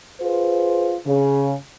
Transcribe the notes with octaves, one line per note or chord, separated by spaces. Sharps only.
F4 G#4 B4 C5
C#3